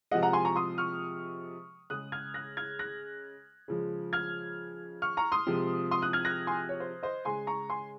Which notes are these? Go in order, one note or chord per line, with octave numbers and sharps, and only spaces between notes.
C3 F3 G#3 D#5 F#5
F#5 A#5
G#5 C6
A#5 C#6
C6 D#6
C#6 F6
C#3 G#3 D#6 F#6
F6 G#6
F#6 A#6
F6 G#6
F#6 A#6
C#3 F3 G#3
F6 G#6
C#6 F6
A#5 C#6
C6 D#6
C3 F3 G#3
C6 D#6
D#6 F#6
F6 G#6
F#6 A#6
G#5 C6
C#5
C5
C5 D#5
C#3 G#3 G#5 C6
A#5 C#6
G#5 C6